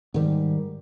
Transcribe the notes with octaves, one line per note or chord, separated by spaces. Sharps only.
G#2 D#3 G3